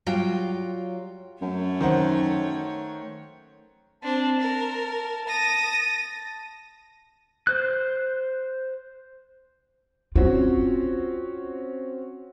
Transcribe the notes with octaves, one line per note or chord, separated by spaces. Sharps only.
F#3 G3 F4 F5 G5
F#2 A3 C#5
D#3 C5 F#5
C4 D4 A5
A#4
D#6 A#6
C5 F#6
C4 C#4 F4 F#4